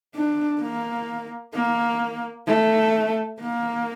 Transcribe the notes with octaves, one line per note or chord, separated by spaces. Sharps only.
D4
A#3
A#3
A3
A#3